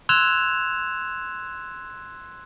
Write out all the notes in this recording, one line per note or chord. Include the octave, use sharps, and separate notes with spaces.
C6 E6 F#6 G#6 E7 F7